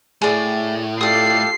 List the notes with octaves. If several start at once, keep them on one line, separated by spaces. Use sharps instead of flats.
A2 G#4 D5
F4 G4 A4 D5 D#6 C7